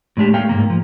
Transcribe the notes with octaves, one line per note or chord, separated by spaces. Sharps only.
A2 G#3 D4 G4
A3 A#3 F5 G5
G#2 B2 A#3
F3